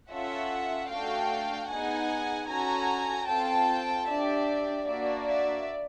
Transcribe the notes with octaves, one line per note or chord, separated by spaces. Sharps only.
C#4 F4 A4 E5 F#5
A3 D4 F#4 A4 F5 G5
B3 D#4 G#4 F#5 G#5
C#4 F#4 A4 G#5 A#5
C4 F4 A4 G5 A5
D4 G4 D5 E5
A#3 D4 F#4 D5 E5
D5 E5